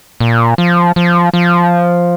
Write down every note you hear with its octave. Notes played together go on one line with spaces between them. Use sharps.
A#2
F3
F3
F3